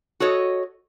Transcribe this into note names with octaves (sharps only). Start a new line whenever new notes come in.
F#4 A4 C#5 D#5